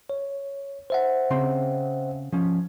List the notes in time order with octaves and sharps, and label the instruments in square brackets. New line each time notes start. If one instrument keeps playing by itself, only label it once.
[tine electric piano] C#5
C5 E5 F#5
[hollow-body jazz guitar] C#3 C4 C6
F3 C#4